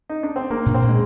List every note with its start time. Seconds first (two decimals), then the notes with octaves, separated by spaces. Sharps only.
0.09 D#4
0.23 D4
0.36 C4
0.50 A#3 D4
0.66 A#2
0.74 C4
0.82 A#2
0.89 G#3